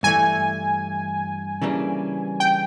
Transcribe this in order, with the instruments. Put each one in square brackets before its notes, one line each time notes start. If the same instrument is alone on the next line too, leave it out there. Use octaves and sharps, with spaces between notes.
[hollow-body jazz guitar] G2 E3 A3 [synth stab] G#5
[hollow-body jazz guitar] C#3 E3 G3 A#3 D4
[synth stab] G5